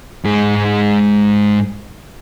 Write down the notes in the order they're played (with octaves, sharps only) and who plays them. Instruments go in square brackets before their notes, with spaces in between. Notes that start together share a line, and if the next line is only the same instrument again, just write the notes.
[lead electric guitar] G#2 G#3